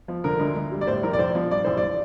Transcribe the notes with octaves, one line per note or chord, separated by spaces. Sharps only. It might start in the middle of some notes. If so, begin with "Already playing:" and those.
F3
D3 A#4
D2
D2
G3
D5
A2 C5
A#1 A#4
D5
A#1 C5
F3
G2 D5
A1 C5
D5